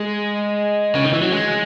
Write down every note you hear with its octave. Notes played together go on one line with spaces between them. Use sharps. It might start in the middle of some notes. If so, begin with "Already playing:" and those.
Already playing: G#3
C#3
D#3
E3
F#3
G#3